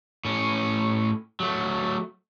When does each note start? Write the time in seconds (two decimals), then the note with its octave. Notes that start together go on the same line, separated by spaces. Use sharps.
0.25 A2 C#4
1.40 F#3 A3